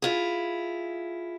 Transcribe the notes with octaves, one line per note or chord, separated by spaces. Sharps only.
E4 F4 G#4